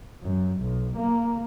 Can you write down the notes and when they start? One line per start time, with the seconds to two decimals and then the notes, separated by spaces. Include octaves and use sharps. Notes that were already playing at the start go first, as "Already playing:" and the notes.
0.23 F#2
0.62 B1
0.97 A#3